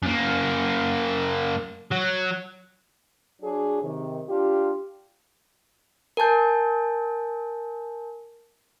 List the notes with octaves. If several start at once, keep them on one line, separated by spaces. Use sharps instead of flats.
F#2 A#3
F#3
F#3 D4 F#4 G#4
C3 D#3
D4 F4 G4
A#4 G#5 A5 G6